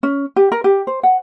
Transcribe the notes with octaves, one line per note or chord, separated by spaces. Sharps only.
C#4
G4
A#4
G4
C5
F#5